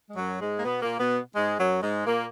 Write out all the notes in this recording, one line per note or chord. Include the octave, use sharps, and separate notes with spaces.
G#3
F#2 F#3
G#2 G#3
A#3
B2 B3
A#2 A#3
B2 B3
G#2 G#3
F#2 F#3
G#2 G#3
A#2 A#3